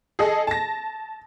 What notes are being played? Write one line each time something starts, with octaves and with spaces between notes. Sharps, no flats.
G#4 A4 D#5
A5 A#6